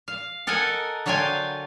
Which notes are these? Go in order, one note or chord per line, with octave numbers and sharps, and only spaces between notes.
F5
A4 A#4 D#5 F#5 G#5
D3 F#3 F4 F5 G5 G#5